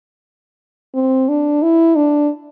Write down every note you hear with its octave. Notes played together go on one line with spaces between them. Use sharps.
C4
D4
E4
D4